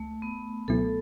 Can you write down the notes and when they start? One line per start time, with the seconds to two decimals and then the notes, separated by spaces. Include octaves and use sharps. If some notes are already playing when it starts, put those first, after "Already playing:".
Already playing: C#2 A3
0.22 B3
0.68 C#2 B2 F#3 B3 E4 A4